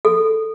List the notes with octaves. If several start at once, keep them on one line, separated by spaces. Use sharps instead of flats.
A4